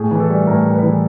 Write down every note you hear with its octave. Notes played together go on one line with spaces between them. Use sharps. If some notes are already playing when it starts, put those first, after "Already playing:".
Already playing: A2 G#4
E3
A4
G3
A2 A#4
A2
B4
E3